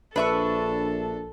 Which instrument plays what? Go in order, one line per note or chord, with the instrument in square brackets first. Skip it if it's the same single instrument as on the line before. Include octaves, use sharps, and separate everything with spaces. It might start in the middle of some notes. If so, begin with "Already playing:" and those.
[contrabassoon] A#1 [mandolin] D4 E5 C#6 [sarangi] A4 [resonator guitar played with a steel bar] B4